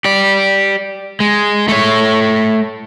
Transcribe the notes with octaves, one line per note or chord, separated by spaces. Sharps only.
G4 D5
G#3
A3 C#5